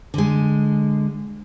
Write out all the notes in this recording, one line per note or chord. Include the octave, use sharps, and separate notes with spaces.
D3 G#3